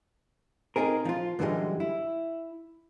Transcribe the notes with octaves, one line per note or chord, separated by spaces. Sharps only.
C4 D4 D#4 G#4 A#4
F3 F4
F#2 D3 E3 F3 G3 G#3
E4